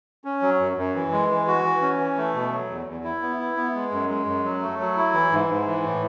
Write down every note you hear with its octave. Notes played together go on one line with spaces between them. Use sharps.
C#4
F#3
F#2
F#2
E3
G#3
E3
F#4
E3
C#4
E3
A3
B2
F#3
E2
E2
E4
B3
E4
B3
G#3
F#2
G#3
F#2
F#3
A3
F#3
E4
E3
G#2
G#2
E3
A2